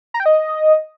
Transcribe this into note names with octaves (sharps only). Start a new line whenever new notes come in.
A#5
G5
D#5